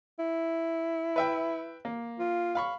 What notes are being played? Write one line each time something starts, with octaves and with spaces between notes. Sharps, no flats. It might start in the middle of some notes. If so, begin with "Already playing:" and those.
E4
B4 E5 G5
A#3
F4
F5 B5 C#6